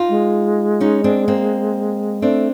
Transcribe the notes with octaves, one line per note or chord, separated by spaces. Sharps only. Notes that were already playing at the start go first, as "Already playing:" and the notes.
Already playing: D#4 F4
G#3
C#4 D#4
C4 D4
A#3 C4
A3 C4 D4